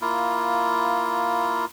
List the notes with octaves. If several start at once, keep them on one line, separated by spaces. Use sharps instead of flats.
A#3 E4 F4